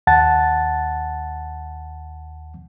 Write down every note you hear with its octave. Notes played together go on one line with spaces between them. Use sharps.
D#2 F#5 A5 A6